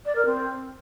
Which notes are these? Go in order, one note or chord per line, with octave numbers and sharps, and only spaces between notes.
D5
A#4
C4